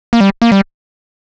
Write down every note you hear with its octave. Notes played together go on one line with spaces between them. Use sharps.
A#3
G3
A#3
G3